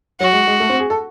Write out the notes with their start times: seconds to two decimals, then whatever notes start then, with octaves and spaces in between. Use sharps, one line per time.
0.20 F#3 F#4
0.33 G#3
0.47 G#3
0.60 A3
0.70 C4
0.80 G#4
0.90 A4